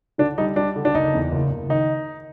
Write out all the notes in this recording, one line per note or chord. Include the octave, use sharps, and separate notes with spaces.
D3 D4
G3 D#4
G3 D4
D3
D4
F#1 D#4
E2
F#1
F#1
D#3 D#4